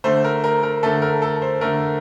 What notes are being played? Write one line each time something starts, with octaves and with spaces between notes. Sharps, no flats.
D3 A3 C5
A#4
A#4
A#4
D3 A3 A4
A#4
A4
C5
D3 A3 A#4